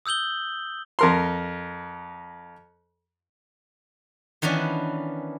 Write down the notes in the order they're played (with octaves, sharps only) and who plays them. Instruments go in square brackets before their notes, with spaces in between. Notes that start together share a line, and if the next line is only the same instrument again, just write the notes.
[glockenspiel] D#6 E6 G6 F#7 G7
[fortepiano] F2 A#4 C6
[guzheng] D#3 E3 B3 C#4 D4